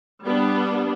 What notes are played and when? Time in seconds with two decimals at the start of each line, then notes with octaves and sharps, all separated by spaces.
0.23 G3 B3 D4